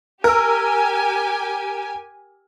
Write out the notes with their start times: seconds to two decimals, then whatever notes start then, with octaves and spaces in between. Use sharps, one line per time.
0.24 G4 A#4 G#5 E6